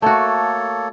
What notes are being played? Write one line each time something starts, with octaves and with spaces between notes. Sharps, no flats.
A3 A#3 F#4 A4 C#5